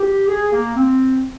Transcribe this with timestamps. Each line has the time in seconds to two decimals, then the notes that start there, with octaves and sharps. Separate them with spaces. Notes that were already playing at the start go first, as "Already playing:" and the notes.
Already playing: G4
0.27 G#4
0.52 A#3
0.76 C4